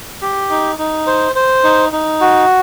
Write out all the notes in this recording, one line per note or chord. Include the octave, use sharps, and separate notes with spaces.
G4
D#4
D#4
C5
C5
D#4
D#4
F#4